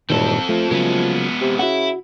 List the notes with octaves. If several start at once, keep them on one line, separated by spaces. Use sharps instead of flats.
E1 G2 A#2 D#3 C4 A4
F3 A3
C#3 F#3 G#3 A#3 B3
C3
C#3 E4 F#4 F#5